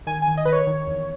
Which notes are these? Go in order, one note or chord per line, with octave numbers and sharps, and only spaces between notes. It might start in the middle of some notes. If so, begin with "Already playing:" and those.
D#3 G#5
G#5
D#3
D#5
D#3 B4
C#5
D#3
E2